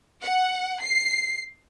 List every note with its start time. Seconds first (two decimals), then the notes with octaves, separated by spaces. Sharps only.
0.22 F#5
0.82 C7